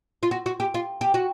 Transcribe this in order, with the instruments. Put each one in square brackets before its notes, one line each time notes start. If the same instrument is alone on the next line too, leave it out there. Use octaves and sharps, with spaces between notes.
[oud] F4
F#4
F#4
G4
F4
G4
F#4